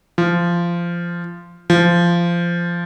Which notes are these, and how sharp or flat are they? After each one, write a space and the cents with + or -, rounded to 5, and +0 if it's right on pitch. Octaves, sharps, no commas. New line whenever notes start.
F3 -20
F3 -20